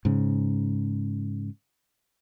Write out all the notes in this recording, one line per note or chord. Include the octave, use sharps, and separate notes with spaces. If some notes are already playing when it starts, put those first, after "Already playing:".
G#2 C#3